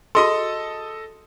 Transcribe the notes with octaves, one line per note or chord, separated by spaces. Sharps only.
F#4 G#4 A4 D#5 C6 D#6